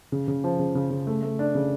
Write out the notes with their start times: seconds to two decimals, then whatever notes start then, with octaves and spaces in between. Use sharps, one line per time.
0.12 C#3
0.28 C#3
0.44 F3
0.59 C#3
0.75 C#3
0.90 C#3
1.07 A3
1.22 A3
1.39 D4
1.55 C#3